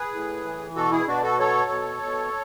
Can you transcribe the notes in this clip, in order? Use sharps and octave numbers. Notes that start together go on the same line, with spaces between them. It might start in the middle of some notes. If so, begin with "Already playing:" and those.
Already playing: G#4 B4
A2
E3
B2 F#4 A4
E4 G#4
B2 D4 F#4
F#4 A4
F#3 A4 C#5
B2
B2